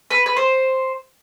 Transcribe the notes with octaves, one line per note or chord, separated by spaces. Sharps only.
B4
B4
C5